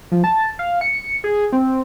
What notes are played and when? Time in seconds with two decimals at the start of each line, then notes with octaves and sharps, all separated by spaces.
0.12 F3
0.24 A5
0.59 F5
0.81 C#7
1.24 G#4
1.52 C4